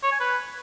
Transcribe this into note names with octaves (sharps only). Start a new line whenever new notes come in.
C#5
G#5
B4